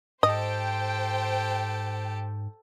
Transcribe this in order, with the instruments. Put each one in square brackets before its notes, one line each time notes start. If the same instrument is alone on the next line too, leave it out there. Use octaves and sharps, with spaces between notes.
[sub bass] G#2 [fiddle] G4 A4 [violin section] C5 G5 [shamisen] D#5